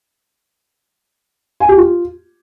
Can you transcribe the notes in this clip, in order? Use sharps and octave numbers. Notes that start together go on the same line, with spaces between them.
G#5
G4
F4